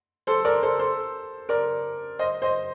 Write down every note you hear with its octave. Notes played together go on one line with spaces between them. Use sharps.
A4 C5
A#4 D5
A4 C5
A4 C5
A#4 D5
C5 D#5
C5 D#5